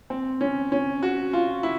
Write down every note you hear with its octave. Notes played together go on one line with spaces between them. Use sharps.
C4
C#4
C#4
F#4
F4
E4